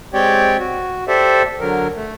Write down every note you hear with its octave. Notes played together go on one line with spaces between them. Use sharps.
G#3 C4 G4 C#5 D5 G5
F#4
G4 A4 C5 D5 E5
D3 F#3 A#4
A3